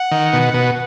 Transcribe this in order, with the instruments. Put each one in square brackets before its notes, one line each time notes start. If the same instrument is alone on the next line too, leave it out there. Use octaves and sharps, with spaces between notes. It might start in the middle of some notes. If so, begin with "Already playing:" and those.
Already playing: [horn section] F#5
[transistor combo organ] D#3
B2
B2